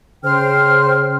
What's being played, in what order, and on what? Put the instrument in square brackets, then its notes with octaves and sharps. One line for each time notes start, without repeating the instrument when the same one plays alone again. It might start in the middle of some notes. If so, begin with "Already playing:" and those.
[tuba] C#3 [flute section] C5 G5 F6